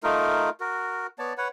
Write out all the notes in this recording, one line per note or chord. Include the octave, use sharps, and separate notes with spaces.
A3 D#4 F4 A#4
F#4 A#4
B3 C#5 D5 A5
B4 C#5 F#5